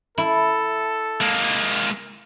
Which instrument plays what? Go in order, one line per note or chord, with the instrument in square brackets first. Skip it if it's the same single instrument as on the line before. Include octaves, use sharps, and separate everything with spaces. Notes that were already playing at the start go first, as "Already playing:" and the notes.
[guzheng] E4 [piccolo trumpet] A4
[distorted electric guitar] G#3 A#3